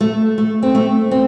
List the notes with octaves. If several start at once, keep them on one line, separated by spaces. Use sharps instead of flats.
A3
A3
C4
A3
C4